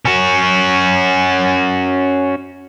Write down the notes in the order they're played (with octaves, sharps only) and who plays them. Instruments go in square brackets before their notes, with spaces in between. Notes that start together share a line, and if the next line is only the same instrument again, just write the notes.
[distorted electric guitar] C#4 F#4